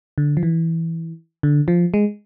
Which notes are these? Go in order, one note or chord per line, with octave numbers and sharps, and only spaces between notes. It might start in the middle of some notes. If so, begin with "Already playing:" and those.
D3
F3
E3
D3
F3
G#3